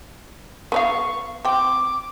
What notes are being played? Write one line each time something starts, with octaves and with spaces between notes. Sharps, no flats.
B3 B4 F5 C#6
C4 G5 D6